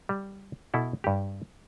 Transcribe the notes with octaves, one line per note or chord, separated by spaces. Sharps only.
G3
B2 E4 A4
G2 G4